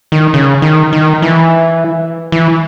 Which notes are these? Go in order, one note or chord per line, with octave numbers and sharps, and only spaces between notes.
D#3
C#3
D#3
D#3
E3
E3